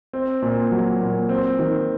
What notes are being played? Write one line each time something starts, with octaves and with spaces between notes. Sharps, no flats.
C4
A#2
F#3
A#2
C4
D#3